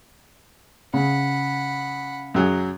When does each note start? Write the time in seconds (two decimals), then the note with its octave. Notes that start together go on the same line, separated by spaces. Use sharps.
0.94 C#3 F#5 B5
2.35 F#2 F#3 G#4